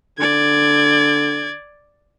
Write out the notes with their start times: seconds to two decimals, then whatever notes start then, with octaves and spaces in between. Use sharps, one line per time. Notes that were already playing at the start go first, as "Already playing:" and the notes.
0.19 D3 D5 G#6